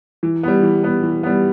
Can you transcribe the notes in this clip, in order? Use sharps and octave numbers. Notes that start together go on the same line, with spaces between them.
E3
G3 B3
E3
G3 B3
E3
G3 B3